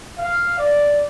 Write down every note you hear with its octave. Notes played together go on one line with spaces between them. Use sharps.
F5
D5